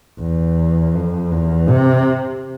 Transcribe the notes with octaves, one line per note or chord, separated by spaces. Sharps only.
E2
F2
E2
C3